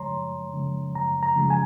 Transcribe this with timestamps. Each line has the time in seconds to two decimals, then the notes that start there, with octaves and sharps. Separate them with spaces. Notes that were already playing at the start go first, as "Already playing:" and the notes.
Already playing: F#2 C#3 F3 G#3 C#5 A#5 C6
0.12 F#2
0.54 C#3 F3 G#3
0.95 F#2 A#5
1.23 A#5
1.36 C#3 F3 G#3
1.50 G#5